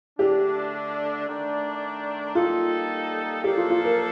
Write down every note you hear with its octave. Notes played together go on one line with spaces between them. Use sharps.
D3 A3 D4 G4
D#3 A3 D4
G3 A#3 D#4 F4 A4
F3 A#3 D4 G4 A4
F4
F4
A#4